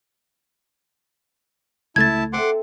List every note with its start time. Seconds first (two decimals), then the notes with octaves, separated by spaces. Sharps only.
1.96 C#2 A3 E4 A5 G#6 A6
2.33 C4 A4 E5 F#5 C6 D6